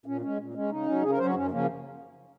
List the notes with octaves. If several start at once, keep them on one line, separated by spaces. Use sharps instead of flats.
A#2 C#4
G#3 C#4
A#2
G#3 C#4
C#3 D#4
F#3 C#4
C#3 G#4
A#4
F#3 C#4 C5
F#4
F#2 C#4
C#3 F3 A#3 C#4